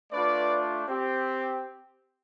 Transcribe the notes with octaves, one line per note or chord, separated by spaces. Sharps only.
A3 D4 F4 B4 D5
C4 G4